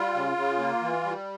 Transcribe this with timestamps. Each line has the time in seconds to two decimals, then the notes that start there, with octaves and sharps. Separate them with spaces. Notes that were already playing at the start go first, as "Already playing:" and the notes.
Already playing: G3 F4
0.14 C#3
0.37 C#3
0.59 A#3
0.81 E3
1.04 G3